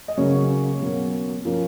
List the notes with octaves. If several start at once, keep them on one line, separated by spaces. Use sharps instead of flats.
D#5
C#3 F#3 A#3 C#4 C#5
B2 F#3 A#3 C#4
F3 A#3 C#4